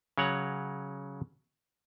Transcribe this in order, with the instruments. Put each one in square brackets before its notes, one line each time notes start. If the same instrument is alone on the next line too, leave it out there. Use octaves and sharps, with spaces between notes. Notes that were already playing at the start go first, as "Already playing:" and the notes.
[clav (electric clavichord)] C#3 F#3 C#5 F#5 A#5